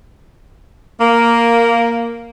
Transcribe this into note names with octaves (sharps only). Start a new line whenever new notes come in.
A#3